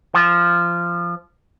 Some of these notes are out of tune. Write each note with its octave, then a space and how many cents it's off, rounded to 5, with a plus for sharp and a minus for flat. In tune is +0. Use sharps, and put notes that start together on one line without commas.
F3 -15